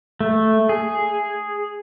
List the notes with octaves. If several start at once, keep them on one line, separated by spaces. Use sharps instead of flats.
A3
G#4